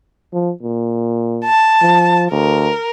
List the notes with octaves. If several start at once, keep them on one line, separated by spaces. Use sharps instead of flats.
F3
A#2
A5
F3
D2 A#4